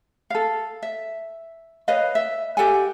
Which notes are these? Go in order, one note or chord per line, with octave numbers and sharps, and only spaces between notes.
A4 F5
E5
B4 C#5 D#5 F5
E5
G4 A4 F#5 G#5